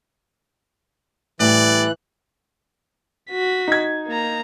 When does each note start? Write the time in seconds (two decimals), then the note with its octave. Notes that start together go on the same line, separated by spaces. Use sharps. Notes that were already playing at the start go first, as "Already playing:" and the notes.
1.40 A2 E3 G3 G4 D5 F#6
3.31 F#4 B6
3.68 D#4 G#6
4.07 A#3 A#5